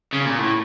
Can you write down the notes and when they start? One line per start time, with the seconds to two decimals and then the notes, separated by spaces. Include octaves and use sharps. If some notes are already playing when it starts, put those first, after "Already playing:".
0.13 C#3
0.25 A#2
0.38 A2